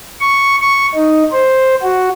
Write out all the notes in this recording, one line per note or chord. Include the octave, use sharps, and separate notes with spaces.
C#6
C#6
D#4
C5
F#4